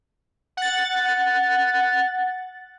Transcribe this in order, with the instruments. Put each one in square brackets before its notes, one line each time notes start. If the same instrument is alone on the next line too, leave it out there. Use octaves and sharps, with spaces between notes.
[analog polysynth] F#5 A6